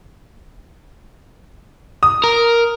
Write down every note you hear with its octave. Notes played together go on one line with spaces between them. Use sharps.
D#6
A#4